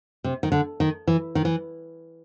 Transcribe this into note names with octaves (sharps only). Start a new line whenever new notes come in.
C3
D#3
D3
D#3
E3
D#3
E3